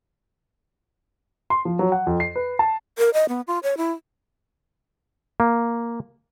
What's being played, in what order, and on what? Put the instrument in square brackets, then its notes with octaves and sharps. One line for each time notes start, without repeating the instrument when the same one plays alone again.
[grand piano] C6
F3
F#3
F#5
F2
C7
B4
A5
[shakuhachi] A#4
D#5
B3
F4
C#5
E4
[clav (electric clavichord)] A#3